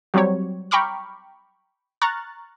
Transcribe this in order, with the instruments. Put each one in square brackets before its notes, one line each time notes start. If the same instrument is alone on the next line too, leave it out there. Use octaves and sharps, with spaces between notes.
[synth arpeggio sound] F#3 G3 C4 G4 C#5
G5 A#5 B5 C#6 D6 F6
A#5 C#6 F6 F#6 A6